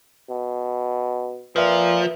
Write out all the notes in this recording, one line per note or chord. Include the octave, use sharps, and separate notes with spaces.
B2
A#2 F3 B4 E5